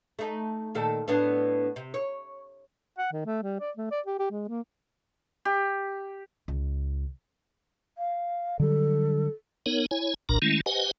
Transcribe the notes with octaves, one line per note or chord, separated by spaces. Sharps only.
A3 D#4
A#2 D#3 A4
A2 B3 D4
C3
C#5
F#5
D#3
A3
G3
D5
A3
D5
G4
G4
G#3
A#3
G4
C#2
F5
D3 F#3 G3 A4
B3 D#4 A#4 C#5
E4 C#5 G#5
F#1 C2 A#2 D4 A#4 A#5
D#3 G#3 A3 C#4 E4
G4 B4 C5 D#5 F#5 G#5